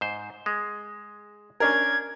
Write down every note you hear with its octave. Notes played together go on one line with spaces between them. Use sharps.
G#2 C5
G#3
C#4 D4 A#4 G#6